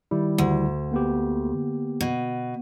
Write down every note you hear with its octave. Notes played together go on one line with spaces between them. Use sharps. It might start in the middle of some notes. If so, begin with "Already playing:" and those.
D#3 G3 E4
D2
A#3 B3 G4
B2